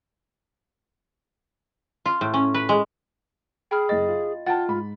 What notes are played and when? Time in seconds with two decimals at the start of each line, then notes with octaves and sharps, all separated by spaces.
2.06 F4
2.21 A2
2.34 C#4
2.54 B4
2.69 G#3
3.71 G#4 G5 B5 F6
3.89 F#1 D#5 A6
4.08 F4
4.46 F4 F#5 G5 A5 A6
4.68 G#2 B5